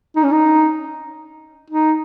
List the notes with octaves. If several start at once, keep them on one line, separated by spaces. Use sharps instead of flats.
D#4
C#4
D#4
D#4